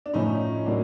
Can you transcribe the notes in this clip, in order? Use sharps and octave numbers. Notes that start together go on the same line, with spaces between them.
D4
A2 F3 A3 C#4 D#4
A2 F#3 A#3 D4